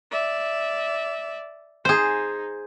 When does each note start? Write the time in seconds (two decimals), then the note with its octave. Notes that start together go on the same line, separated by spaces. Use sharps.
0.11 D5 E5
1.85 D#4 G#4 C5